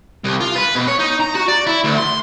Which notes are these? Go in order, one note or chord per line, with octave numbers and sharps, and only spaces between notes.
C2
F4
B4
B2
C#5
D#4
A#5
F#4
D5
E4
D2
C6